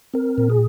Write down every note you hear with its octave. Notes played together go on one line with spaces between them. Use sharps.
C4 A#4
A#2
G#4